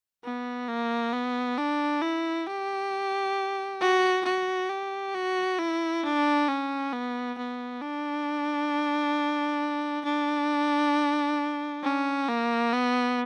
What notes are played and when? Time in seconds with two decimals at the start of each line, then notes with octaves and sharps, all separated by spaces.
0.24 B3
0.68 A#3
1.13 B3
1.58 D4
2.02 E4
2.47 G4
3.81 F#4
4.25 F#4
4.70 G4
5.15 F#4
5.59 E4
6.04 D4
6.48 C#4
6.93 B3
7.38 B3
7.82 D4
10.05 D4
11.83 C#4
12.28 A#3
12.73 B3